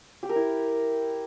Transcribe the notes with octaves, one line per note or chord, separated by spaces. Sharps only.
G4
A#4
E4